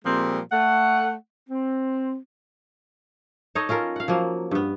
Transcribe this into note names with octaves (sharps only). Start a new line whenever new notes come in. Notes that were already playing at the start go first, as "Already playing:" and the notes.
A#2 F3 G3 G#3 C4
A3 F#5
C4
D#4 A4 C#5 D#5
C#4 F4 A4 A#4
F5 F#5
F3 F#3 A#3
G2 B3